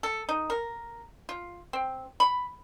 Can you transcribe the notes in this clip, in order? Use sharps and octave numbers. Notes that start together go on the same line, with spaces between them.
A4
D#4
A#4
F4
C4
B5